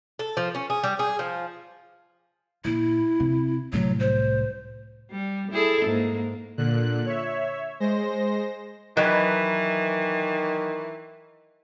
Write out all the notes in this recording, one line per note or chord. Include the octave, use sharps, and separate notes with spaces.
A4
F3
C#4
G#4
G3
G#4
F3
A#2 E4
C3
C2 A2 F#3
C5
G3
E4 G#4 A4
G#2 A#3
A#2 D3 F#6
C#5 E5
G#3 C5 A#6
D#3 E3 F#3 B4 D#5